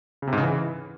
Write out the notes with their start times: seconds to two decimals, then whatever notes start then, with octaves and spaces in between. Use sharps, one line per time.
0.22 C#3
0.27 C3
0.33 G#2
0.38 C#3
0.43 E3